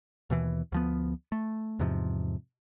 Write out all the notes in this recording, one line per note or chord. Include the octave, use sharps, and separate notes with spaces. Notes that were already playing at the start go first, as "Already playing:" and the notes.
D#2 B2 E3
D2 F3 B3
A3
E2 G#2 C3 F3